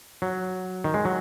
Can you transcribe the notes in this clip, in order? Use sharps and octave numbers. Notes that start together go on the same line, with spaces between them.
F#3
D#3
G#3
F#3